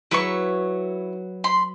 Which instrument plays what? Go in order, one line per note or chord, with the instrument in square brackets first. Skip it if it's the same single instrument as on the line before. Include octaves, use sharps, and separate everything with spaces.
[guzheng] F#3 B4 [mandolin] E4 C#6
[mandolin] B5 C6